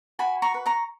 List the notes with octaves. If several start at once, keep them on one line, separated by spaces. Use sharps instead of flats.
F#4 G#5 B5
A#5 C#6
B4
A#5 C#6